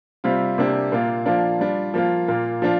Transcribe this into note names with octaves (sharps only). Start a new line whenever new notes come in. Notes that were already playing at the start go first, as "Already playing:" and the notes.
C3 G3 C4 F4
C3 A#3 D4 G4
A#2 A#3 F4
F3 A#3 D4 F4
G3 D4 F4
F3 A#3 F4
A#2 A#3 F4
F3 D4 F4